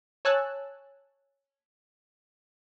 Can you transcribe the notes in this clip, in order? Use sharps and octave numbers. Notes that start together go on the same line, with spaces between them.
C#5 G#5 A5 E6 F#6